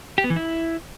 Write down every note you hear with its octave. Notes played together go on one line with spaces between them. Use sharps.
G4
B3
E3
E4